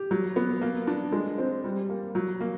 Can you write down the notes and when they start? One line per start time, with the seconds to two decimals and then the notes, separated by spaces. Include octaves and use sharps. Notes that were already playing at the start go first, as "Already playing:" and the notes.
Already playing: G4
0.11 F#3
0.36 B3
0.61 A#3
0.87 D4
1.12 G#3
1.38 C4
1.64 G3
1.90 A#3
2.15 F#3
2.41 A#3